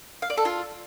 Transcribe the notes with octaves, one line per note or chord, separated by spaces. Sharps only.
F5
D5
A4
F4